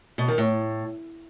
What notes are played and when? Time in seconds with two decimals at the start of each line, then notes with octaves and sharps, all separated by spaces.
0.18 B2
0.28 D#3
0.38 A2